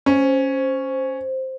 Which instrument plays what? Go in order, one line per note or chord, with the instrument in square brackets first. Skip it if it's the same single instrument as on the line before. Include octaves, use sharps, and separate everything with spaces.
[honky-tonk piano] C#4 [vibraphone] C5